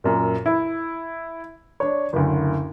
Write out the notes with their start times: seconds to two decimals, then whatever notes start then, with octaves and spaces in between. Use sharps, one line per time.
0.04 F#2 A#2
0.46 E4
1.80 D4 C#5
2.13 F#1 D2